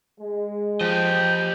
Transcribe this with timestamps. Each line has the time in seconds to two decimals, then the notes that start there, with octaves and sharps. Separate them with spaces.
0.20 G#3
0.81 F3 G4 D#5 G5